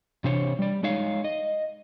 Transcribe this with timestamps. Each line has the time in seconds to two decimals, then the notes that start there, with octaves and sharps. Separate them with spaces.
0.24 C3 E3 D4 C5 C#5
0.59 G3 D5
0.83 G#3 D#4 C#5 F5
1.24 D#5